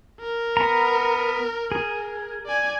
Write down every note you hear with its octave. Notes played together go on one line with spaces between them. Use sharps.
A#4
B3 A#5
G#4
D5 G#5